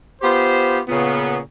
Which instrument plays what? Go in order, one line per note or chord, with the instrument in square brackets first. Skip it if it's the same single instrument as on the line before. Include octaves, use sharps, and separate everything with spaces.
[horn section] B3 F4 G4 C5
A#2 C#3 B3